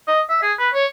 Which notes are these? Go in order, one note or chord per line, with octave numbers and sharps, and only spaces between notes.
D#5
E5
G#4
B4
C#5